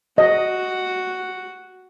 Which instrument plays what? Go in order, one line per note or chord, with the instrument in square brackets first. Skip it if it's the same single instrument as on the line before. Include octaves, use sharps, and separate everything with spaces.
[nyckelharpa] F#4 [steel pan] D#5